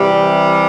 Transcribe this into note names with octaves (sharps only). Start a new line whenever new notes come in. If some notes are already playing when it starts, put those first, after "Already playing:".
Already playing: C3 E3 G3